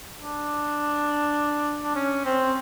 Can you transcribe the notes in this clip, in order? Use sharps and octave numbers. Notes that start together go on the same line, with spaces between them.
D4
D4
C#4
C4